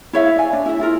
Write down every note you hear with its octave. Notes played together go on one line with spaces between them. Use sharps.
E4 C#5 E5 F5
D5 G#5
D4
E4 E5
E4 F4 A#4